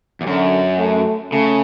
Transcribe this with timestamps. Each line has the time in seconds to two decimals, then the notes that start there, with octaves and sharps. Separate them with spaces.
0.21 E2
0.26 F#2 D3
0.79 A3
1.32 C#3 A3